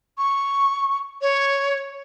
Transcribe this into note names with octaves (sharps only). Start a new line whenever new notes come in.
C#6
C#5